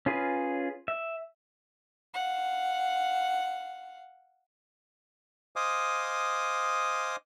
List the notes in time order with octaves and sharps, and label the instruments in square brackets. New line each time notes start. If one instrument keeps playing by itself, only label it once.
[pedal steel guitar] C#4 F4 G#4 B4
E5
[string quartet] F5 F#5
[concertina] C5 D#5 F5 G#5 D6 D#6